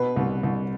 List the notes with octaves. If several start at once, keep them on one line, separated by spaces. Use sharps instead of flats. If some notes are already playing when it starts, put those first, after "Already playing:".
Already playing: B2 B4
C2
C2